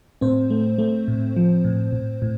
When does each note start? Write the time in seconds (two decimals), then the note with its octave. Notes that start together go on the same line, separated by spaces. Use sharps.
0.21 A2 C4 C5
0.50 A3
0.78 A3
1.08 A2
1.36 F3
1.65 A2
1.93 A2
2.22 A2